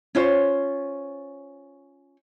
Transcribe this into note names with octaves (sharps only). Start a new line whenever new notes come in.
C#4 F4 C5 C#5